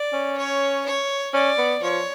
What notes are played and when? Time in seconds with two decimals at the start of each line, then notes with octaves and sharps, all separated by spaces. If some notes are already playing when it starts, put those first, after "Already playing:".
Already playing: D5
0.13 C#4
0.37 C#5
0.85 C#5
1.34 C#4 D5
1.58 B3
1.82 F3 C#5